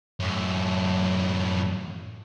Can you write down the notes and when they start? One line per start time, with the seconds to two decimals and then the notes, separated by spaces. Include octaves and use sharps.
0.20 F#2 A2